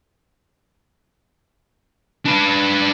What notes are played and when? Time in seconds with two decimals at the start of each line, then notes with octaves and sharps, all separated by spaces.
2.25 D4 B4